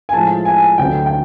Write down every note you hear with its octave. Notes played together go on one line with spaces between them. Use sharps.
G#5
A2 F3 G#3 A5
G#5
D2 D3 F#3 G5
G5